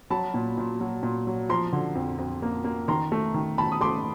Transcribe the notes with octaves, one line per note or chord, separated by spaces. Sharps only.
F#3 A5 B5
A#2
A#2
F#3
A#2
F#3
F3 A#5 C6
D3
F2
F2
A#3
A#3
D#3 A#5 C6
A3
D#3
D#3 A5 B5
D#6
A3 C6 D6